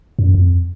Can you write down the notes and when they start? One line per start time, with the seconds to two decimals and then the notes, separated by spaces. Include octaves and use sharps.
0.19 F#2
0.34 F2